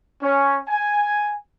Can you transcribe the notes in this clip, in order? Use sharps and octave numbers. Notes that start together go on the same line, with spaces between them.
C#4
G#5